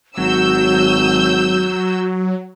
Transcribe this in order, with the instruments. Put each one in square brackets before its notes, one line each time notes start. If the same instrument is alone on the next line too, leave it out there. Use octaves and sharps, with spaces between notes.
[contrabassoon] G#1 [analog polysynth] F#3 [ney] F#4 [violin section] E6 G6